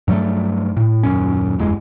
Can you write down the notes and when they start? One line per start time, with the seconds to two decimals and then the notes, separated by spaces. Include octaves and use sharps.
0.08 G2 F#3 G3 A3
0.77 A2
1.03 D#1 F#2 C#4
1.58 F#1 E2 G2 G#3